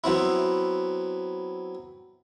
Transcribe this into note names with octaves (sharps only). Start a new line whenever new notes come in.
F#3 B3 C4 E4